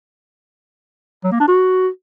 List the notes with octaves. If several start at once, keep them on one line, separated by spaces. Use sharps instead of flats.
F#3
A#3
D4
F#4